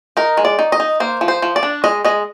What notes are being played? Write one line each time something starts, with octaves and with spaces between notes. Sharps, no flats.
D#4 A#4
G#3
D5
D#4
D#5
D#4
A#3 C5
F3
C5
F3
D5
D4
G#3 D#5
G#3 D#5